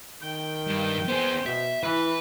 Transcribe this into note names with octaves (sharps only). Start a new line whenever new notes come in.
D#3 G5
G2
B3 G#4 C5
B2 E5
E3 E4 B4